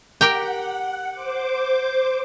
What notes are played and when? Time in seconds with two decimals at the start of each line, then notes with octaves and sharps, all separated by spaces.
0.21 G4 A#4 F#5 G5
1.11 C5 D6